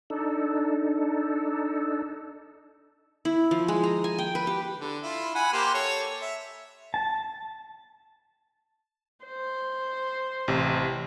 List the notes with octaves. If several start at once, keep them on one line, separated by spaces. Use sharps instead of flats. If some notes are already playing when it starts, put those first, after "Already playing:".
D4 D#4 A4
E4
F3
G#3
A#5
G#5
G5
B4
G4
D3
E4 F4
F#5 G#5 B5
A#3 G4 C5
A4 C#5
E5
A5
C5
A1 C3